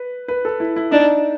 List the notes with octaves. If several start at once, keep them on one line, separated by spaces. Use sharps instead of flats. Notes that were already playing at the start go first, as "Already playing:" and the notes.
Already playing: B4
B4
A4
E4
E4
D4 D#4